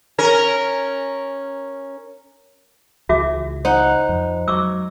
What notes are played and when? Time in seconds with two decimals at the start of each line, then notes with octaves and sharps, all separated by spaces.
0.18 C#4 A#4
3.09 C#2 E3 F#4 E5 D6
3.65 D#4 C5 F#5
4.09 F2
4.48 F#3 C#6 D6 E6